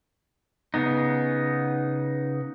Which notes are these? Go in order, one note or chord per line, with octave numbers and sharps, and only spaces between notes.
C#3 B3 D#4